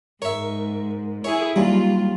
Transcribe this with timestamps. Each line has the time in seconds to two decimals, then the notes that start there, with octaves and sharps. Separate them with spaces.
0.22 G#2 A#4 C#5 E5
1.24 E4 G#4 C#5
1.56 D#2 F#3 G3 F4